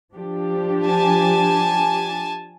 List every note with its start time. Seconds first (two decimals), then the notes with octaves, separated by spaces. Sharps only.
0.14 F3 D4 G4
0.85 G#5 A5